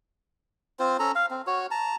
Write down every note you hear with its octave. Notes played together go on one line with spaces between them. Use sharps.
C4 F4 C5
C#4 A4 A#5
F5
C4
F#4 C#5
A5 A#5